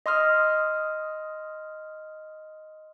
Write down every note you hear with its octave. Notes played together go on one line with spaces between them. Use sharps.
D#5 C6 D#6 F6